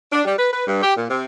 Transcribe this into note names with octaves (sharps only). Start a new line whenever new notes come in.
D4
G3
B4
B4
G2
G4
A#2
C3